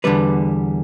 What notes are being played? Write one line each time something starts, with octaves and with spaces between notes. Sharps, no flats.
E2 D3 G3 B3 B4